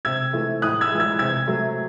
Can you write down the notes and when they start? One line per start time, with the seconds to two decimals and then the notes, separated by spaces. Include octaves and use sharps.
0.05 C3 E6 G#6
0.33 E3 A3
0.62 A2 D#6 F#6
0.81 E6 G#6
0.91 E3 G#3
1.00 E6 G#6
1.19 C3 E6 G#6
1.47 F#3 A3